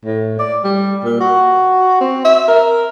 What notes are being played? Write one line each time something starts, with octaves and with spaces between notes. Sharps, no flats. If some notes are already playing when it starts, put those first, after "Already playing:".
A2
D5
G3
A#2
F#4
C4
E5
A#4